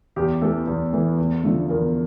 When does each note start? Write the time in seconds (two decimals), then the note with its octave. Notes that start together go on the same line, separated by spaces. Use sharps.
0.16 E2 G4
0.42 E3 A3 A4
0.67 E2
0.93 E3 A3
1.18 E2
1.43 D3 F3 A3
1.69 E2 A#4